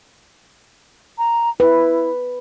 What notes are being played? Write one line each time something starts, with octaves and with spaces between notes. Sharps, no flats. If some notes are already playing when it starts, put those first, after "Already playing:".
A#5
E4 B4